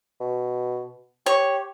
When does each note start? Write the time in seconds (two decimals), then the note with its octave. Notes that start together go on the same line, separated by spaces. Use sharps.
0.20 B2
1.26 G4 C#5